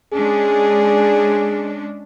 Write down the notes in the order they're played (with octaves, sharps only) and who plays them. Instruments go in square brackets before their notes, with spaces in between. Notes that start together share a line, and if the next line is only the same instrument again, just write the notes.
[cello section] G#3 C#4 D4 [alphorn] G#4